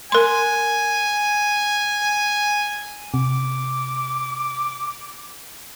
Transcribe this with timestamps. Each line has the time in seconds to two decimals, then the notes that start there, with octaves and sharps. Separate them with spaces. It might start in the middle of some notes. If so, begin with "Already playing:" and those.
0.12 A#4 G#5 C6
3.14 C3 D6